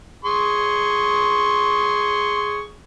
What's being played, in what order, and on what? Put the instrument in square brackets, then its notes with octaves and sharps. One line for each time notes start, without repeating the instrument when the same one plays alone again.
[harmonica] G#4 C6 C#6